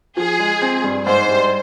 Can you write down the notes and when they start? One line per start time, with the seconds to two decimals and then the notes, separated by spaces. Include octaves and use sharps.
0.17 F3 G#4
0.40 G#3
0.62 C4
0.84 G2
1.07 G#2 C5
1.29 G3